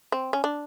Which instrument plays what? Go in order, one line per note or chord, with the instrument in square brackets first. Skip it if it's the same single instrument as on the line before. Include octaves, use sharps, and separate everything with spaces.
[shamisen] C4
C#4
D4